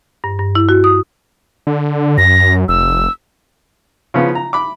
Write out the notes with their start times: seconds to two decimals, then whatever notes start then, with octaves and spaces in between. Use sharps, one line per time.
0.24 G2
0.39 G2
0.55 E4
0.69 F#4
0.84 D#6
1.67 D3
2.18 F#2 A#6
2.68 F1 E6
4.14 C#3 F3 B3 C#4 F4
4.35 A#5
4.53 B5 D6